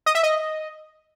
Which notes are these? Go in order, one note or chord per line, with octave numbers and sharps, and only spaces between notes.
D#5
E5
D#5